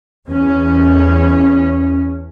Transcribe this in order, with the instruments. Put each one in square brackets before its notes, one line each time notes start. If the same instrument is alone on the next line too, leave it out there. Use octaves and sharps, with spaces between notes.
[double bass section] E2 C#4